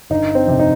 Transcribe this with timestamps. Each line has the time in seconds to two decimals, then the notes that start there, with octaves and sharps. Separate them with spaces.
0.10 G1 D#4
0.35 C4
0.47 F2 C3
0.59 D#4